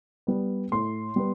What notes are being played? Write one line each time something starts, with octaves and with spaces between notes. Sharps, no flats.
G3 B3
A2 C6
G3 B3